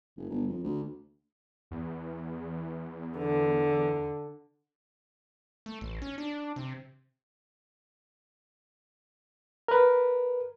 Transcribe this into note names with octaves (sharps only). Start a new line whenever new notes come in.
F#1
G1
F2
D2
E2
D3
A3
A1
C#4
D4
C3
A#4 B4